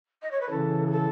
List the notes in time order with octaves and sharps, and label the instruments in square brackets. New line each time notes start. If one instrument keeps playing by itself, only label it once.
[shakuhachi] D#5
C#5
B4
[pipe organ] C#3 E3 [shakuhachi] A4
[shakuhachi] G#4
A4